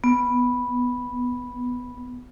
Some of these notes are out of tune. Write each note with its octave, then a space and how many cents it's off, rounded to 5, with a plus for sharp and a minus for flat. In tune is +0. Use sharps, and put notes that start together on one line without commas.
B3 -5